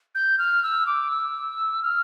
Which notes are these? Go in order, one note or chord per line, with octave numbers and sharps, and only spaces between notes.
G6
F6
E6
D6
E6
F6